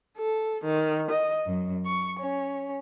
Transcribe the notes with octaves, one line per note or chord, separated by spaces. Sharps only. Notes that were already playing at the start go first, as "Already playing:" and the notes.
A4
D#3
D#5
F#2
C#6
C#4